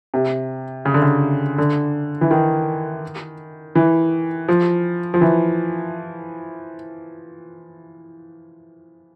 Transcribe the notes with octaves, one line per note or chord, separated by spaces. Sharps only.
C3
C#3
D3
C#3
D3
E3
D#3
E3
F3
F3
E3